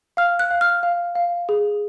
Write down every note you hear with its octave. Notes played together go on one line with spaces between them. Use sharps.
F5 F6
F#6
F5
F6
F5
F5
G#4